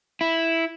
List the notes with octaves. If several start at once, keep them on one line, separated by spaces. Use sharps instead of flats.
E4